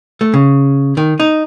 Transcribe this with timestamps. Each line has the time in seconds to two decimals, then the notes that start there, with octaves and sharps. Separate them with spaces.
0.21 A3
0.34 C#3
0.97 D#3
1.20 D#4